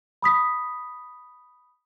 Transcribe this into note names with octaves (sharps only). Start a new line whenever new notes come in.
B5 D#6 B6